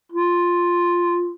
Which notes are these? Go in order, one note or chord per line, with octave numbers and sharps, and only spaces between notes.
F4